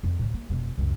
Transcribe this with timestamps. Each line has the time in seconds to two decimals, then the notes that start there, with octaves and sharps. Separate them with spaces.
0.03 F2
0.19 D2 A2
0.34 A#3
0.49 E1 F2
0.78 C#2 F#2